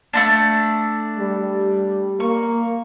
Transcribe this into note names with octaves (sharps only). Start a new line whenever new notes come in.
A3 C4 D4
G3
A#3 C#6